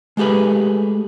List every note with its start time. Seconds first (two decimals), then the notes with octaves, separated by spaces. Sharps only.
0.17 G#3 A3 G4 G#4 B4